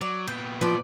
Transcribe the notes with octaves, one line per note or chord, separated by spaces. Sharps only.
F#3 D5
A#2 B3 G5
F3 B4 D5